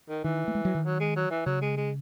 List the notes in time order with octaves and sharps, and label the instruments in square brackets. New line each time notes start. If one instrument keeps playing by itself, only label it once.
[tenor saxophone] D#3
[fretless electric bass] D#3 [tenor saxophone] E3
[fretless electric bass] A3
G#3
F#3
D#3
[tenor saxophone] F#3
G#3
F#3
E3
[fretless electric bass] C#3 [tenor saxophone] F#3
[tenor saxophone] G#3
G#3